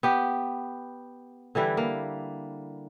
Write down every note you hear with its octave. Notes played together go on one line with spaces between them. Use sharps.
B3 G4
D3 E3 G3 E4
A#3